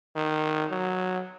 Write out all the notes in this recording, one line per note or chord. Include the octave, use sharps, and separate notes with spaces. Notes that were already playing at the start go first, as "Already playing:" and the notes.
D#3
F#3